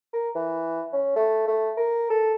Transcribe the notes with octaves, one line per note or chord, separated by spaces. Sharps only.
A#4
E3
C#4
A3
A3
A#4
A4